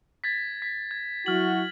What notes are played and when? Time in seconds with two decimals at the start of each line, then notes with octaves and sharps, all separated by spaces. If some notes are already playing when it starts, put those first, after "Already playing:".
0.24 G#6 A6 B6
0.62 B6
0.91 G#6
1.26 F#3 E4 F#4 F6 F#7